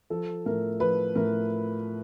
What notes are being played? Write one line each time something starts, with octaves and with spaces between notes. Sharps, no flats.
F3 A4
A2 A#4
F3 B4
A2 A#4